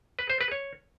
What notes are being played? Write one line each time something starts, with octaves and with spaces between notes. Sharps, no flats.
B4
C5
B4
C#5